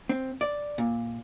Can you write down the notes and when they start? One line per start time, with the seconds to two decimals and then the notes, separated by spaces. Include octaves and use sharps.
0.09 C4
0.41 D5
0.78 A#2